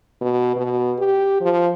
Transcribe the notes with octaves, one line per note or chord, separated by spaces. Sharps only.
B2
B2
G4
F3